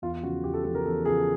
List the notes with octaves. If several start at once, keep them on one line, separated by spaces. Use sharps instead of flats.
E2 F4
C#3 F3 F#4
E2 G4
A4
C#3 F3 A4
A#4
E2 A4
C#3 F3 G#4